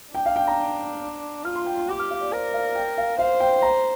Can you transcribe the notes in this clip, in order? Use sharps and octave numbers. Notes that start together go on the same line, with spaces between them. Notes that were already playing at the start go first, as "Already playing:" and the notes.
D4 G5
F5
G5
A#5
F4 F6
C6
G5
C6
G4 D6
F6
F5
D5
A#4 C5
F5
G5
F5
C5 F5
G5
A#5